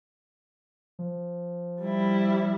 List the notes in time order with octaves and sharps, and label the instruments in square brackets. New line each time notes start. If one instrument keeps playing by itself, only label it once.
[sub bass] F3
[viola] G3 E4